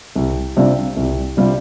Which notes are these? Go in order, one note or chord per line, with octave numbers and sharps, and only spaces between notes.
C2
C3 G3 D4 F4
C2
C3 G3 D4 F4